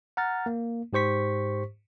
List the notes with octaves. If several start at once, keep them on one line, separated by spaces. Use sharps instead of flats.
F#5 A#5 F6 A6
A#3
G#2 G4 C5 C#6 B6